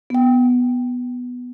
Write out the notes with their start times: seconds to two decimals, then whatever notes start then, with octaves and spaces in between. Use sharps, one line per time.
0.10 B3 G5